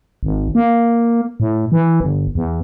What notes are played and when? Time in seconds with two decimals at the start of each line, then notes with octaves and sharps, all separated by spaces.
0.23 G#1
0.55 A#3
1.40 A2
1.72 E3
2.00 G1
2.35 E2